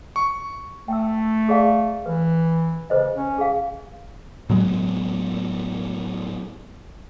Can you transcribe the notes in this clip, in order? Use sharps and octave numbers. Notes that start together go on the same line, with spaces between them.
C#6
A3 G5 E6
G#4 D5 F5
E3 B4
C#3 B4 C5 D#5
C#4
G#4 F5
A2 F#3 G#3 B3